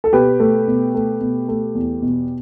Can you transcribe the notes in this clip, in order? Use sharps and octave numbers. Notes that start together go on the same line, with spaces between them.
A4
B2 G4 B4
A3
B2
A3
B2
A3
E2
B2